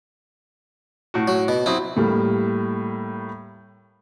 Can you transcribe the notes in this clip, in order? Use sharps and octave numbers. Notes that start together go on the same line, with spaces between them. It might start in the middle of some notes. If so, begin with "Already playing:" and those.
A2 F#4
F#3
B2
F#3 C4 E4 D#6
A2 G3 A#3